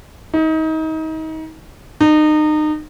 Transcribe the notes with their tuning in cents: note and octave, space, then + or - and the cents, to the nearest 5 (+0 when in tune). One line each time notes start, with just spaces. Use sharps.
D#4 +30
D#4 -30